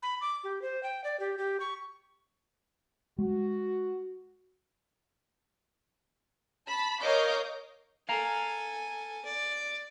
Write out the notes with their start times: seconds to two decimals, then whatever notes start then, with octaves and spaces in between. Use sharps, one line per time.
0.03 B5
0.21 D6
0.44 G4
0.62 C5
0.83 G5
1.04 D5
1.20 G4
1.38 G4
1.60 C#6
3.19 G#3 F#4
6.67 A5 B5
7.01 A#4 C#5 D#5 F5 D6 G6
8.09 A4 F5 G#5 A#5
9.25 D5